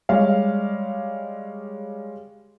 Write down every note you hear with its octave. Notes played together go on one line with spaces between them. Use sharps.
G3 G#3 C#5 F5